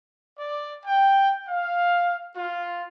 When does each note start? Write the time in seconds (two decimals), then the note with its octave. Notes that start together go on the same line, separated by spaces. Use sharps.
0.38 D5
0.85 G5
1.48 F5
2.36 F4